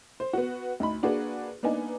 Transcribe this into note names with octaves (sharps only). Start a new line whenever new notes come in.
C5
B3 F#4
D2 D#4 B5
A#3 D4 F#4 G#4 B4
A#3 B3 D4 D#4 G#5